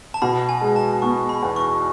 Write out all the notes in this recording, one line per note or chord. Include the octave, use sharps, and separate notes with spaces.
A5
B2 B5
G#5
G#3
A5
B3 C#6
B5
E2
C#6